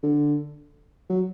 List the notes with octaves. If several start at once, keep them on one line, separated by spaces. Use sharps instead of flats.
D3
F#3